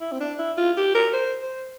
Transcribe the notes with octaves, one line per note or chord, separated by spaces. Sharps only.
E4
C4
D4
E4
F4
G4
A#4
C5
C5